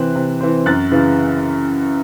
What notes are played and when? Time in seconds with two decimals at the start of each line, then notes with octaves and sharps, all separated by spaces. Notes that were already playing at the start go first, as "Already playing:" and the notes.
Already playing: C3 E3 C4 F#6
0.15 C3
0.41 E3 C4
0.66 F#2 F#6 A6
0.92 C#3 E3